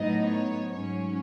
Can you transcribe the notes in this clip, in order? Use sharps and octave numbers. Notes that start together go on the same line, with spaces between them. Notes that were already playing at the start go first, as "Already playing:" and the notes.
Already playing: A2 F#3 B3 D#4 D#5
C#5
G#2 F#3 C#4 C#5